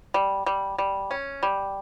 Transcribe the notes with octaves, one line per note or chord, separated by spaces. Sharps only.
G3
G3
G3
C#4
G3